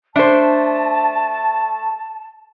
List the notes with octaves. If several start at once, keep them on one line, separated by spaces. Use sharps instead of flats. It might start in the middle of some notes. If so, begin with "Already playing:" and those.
A3 D4 C5 A5